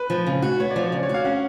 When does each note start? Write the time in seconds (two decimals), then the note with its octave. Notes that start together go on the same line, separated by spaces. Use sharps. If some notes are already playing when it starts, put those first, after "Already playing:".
Already playing: B4
0.10 F3
0.27 C#3
0.42 F#4
0.60 B3 C#5
0.71 D5
0.76 F3
0.83 C#5
0.92 C#3 D5
1.03 C#5
1.09 F#4 F5
1.25 C#4 F#5